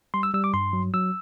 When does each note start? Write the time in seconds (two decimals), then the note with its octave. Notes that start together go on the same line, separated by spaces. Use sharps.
0.14 G3 C6
0.23 E6
0.34 G3 E6
0.44 D6
0.54 G2 C6
0.73 F#3
0.94 F#3 E6